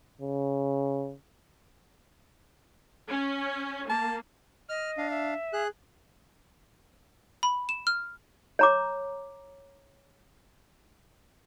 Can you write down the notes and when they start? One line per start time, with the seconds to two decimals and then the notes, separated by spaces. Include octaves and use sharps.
0.21 C#3
3.09 C#4
3.90 A#3 A5
4.69 D#5 F6
4.98 D4 F5
5.10 E5
5.53 G#4 F#6
7.43 B5
7.69 E7
7.87 F6
8.59 C#5 A#5 D6